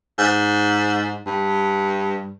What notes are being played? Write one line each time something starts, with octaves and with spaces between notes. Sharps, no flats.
G#2
G2